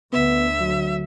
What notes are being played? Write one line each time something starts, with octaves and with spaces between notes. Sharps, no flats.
D2 D3 B3 E5
F#3